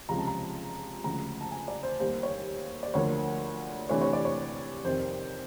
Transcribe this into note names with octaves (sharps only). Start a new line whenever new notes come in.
C#2 C3 F3 G#3 C#4 A#5
A5
A#5
D2 C#3 F3 G#3 A#5
A5
G#5
D5
C5
D#2 D#3 G3 C5
C#5
D5
D2 D3 F3 A#3 C#5
C3 E3 A3 D4 C#5
C#5
D5
C#5
F2 C3 D#3 C5